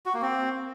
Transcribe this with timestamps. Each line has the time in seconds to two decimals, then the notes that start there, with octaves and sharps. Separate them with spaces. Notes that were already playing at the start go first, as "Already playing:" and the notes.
0.06 F#4
0.14 A#3
0.22 C4